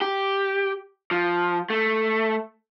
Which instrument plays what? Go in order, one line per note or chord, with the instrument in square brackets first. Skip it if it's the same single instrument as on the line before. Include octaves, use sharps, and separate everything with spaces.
[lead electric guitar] G4
F3
A3